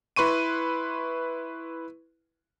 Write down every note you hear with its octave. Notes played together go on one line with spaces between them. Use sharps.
E4 B4 C6 C#6 D#7